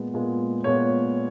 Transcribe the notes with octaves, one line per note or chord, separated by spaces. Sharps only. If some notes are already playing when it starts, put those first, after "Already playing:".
Already playing: A#2 G#3 B3
A#2 G#3 B3
A#2 G#3 B3 C#5